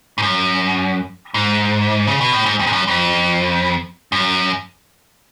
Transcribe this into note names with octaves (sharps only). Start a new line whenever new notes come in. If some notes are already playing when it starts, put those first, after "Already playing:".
G#2
F#2
G#2
C#3
B2
A2
G#2
F2
G#2
F#2
F2
F#2